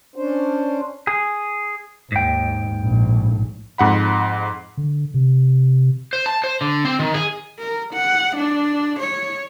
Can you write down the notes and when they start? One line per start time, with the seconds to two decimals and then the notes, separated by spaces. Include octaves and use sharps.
0.16 C#4 D4 C5
1.07 G#4
2.12 D#2 G#2 G5
2.82 A#1 A2
3.78 F2 G#2 F#5 B5
4.77 D3
5.14 C3
6.13 C5
6.26 A5
6.44 C5
6.61 D3
6.85 C4
6.99 D#3
7.14 G#4
7.59 A#4
7.94 F#5
8.37 D4
9.00 C#5